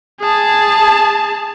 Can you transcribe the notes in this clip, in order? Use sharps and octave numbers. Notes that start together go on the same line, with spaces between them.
G#4 A5